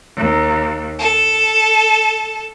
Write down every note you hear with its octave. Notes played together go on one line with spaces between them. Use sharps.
D#2
A4